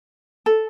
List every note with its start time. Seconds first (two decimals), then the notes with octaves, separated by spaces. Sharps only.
0.46 A4